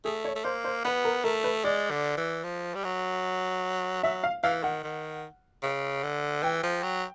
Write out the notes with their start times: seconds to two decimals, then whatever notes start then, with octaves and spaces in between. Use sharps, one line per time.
0.05 A3 G#4
0.25 C#5
0.35 A3
0.44 A#3 C5
0.65 C5
0.85 B3 B4
1.05 A#4
1.24 A3 A#4
1.44 B4
1.64 G#3 D5
1.90 D3
2.17 E3
2.44 F3
2.75 G3
2.84 F#3
4.03 F#3 E5
4.23 F5
4.43 E3 F5
4.63 D#3 F#5
4.83 D#3
5.63 C#3
6.03 D3
6.43 E3 G5
6.63 F3
6.83 F#3